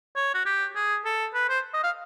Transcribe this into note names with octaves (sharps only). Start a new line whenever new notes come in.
C#5
F#4
G4
G#4
A4
B4
C5
D#5
F5